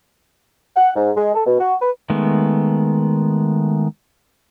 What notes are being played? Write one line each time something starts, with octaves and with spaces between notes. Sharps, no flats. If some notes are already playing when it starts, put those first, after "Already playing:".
F#5
G#2
G#3
A4
B2
F#4
B4
D#3 G#3 A3 B3